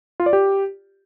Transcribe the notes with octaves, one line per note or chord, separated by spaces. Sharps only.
F4
D5
G4